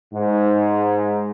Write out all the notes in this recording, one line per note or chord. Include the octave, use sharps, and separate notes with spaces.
G#2